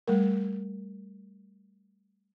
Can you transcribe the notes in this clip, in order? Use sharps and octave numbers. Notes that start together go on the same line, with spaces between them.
G3 A3 A#4